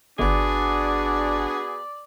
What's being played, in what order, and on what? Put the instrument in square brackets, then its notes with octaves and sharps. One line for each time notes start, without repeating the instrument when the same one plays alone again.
[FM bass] G1 [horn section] B3 F#4 G#4 [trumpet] D4 [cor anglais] D5